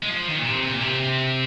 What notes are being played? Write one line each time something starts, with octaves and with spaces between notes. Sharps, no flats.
G#3
F3
D#3
A#2
C3
C3
A#2
C3